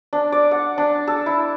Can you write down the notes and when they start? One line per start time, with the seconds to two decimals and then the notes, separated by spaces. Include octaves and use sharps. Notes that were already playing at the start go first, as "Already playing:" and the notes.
0.13 D4
0.32 D5
0.51 F#5
0.78 D4
1.07 A4
1.26 E4